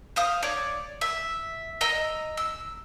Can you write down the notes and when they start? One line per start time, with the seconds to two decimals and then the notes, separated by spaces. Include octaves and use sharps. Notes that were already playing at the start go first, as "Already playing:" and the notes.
0.16 C5 F5 D#6
0.43 C#5 D5
1.01 E5
1.81 D#5 A#5 E6
2.37 E6